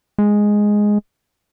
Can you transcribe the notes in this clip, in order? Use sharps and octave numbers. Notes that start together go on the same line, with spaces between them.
G#3